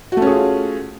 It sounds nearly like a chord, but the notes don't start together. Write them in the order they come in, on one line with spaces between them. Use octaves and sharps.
F#4 A3 C#4 G#4 F4